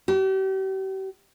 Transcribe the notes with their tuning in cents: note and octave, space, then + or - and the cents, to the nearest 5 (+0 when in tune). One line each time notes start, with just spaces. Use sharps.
G4 -40